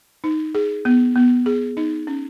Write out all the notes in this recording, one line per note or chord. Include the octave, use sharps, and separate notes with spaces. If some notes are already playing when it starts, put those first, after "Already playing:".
D#4
G#4
B3
B3
G#4
D#4
C#4